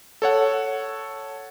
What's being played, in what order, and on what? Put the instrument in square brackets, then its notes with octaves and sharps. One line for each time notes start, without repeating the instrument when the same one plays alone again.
[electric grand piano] A4 C#5 F#5